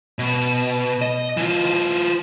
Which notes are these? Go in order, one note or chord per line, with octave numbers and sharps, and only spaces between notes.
B2
D#5
E3 F4